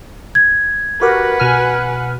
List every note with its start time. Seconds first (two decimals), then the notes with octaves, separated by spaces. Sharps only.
0.35 G#6
1.01 F#4 G4 A#4 B4 F#5
1.40 B2 G#5 F6